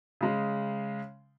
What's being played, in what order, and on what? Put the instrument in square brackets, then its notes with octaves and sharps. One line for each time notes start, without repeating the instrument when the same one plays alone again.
[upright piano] C#3 G#3